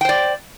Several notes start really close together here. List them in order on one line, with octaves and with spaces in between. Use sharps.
G5 C5 D5